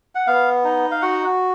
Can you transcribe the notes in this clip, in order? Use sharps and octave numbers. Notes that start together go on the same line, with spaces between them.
F#5
B3 F5
D#4
F5
F#4 F#5